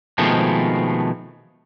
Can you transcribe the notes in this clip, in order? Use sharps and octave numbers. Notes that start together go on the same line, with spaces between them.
B2 D#3 F3 G#3 A3 C4